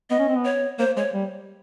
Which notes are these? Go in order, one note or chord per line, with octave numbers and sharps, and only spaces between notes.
B3 D#5
C#4
C4
B3
C#5
A#3 C5
G#3 C#5
G3